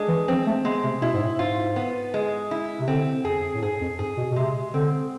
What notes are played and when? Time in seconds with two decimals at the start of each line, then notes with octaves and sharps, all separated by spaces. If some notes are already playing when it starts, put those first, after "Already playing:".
Already playing: G#3 D4
0.09 E3
0.28 F3 C4
0.47 A3
0.64 G#3 B3
0.84 C3
1.02 B2 E4
1.14 G#2
1.21 A2
1.39 G#2 F4
1.76 B3
2.14 G#3
2.51 E4
2.80 C3
2.88 D3 C4
3.24 F2 G#4
3.54 A2
3.62 G#2 G#4
3.81 F2
3.99 G#2 G#4
4.17 B2
4.32 B2
4.36 C3 G#3
4.74 D3 C4